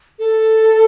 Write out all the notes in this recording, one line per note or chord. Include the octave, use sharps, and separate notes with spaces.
A4